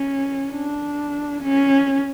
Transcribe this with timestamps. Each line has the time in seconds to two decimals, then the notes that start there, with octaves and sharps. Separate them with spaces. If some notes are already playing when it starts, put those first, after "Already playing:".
Already playing: C#4
0.52 D4
1.43 C#4